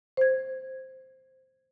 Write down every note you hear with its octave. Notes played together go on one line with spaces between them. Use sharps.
C5 G#6